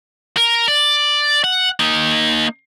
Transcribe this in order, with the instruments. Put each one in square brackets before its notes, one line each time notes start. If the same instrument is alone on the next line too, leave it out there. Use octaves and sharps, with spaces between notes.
[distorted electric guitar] A#4
D5
F#5
A#3 D#4